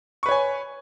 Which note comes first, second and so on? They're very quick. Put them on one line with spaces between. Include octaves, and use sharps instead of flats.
C#6 B4 C#5 G#5